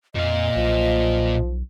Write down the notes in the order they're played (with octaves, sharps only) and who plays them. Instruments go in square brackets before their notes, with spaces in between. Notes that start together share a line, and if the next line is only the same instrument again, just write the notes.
[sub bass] F2 [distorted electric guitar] A#2 F5 [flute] D#5
[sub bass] B1 [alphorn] F3